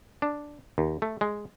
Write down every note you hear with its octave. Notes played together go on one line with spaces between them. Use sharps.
D4
D#2
A3
G#3